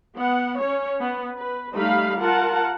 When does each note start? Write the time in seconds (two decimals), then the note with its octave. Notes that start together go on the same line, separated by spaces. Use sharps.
0.16 B3 F#5
0.60 C#4 C#5
1.01 B3
1.36 B4
1.74 G3 A3 D#4 F5 B5
2.20 F4 A#4 F#5 A5